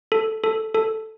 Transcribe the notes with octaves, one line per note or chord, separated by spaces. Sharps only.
A4
A4
A4